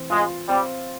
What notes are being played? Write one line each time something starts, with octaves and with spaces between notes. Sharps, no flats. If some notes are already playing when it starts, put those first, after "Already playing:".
Already playing: E3 C4
G#3 F4
G3 C4